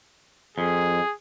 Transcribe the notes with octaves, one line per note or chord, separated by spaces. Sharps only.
F2 G#4